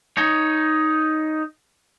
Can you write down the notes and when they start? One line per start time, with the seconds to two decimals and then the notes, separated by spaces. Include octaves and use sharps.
0.17 D#4 C#5